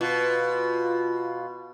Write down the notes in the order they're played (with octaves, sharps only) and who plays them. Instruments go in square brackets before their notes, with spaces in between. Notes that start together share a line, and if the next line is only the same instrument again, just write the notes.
[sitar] B2 [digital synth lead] F4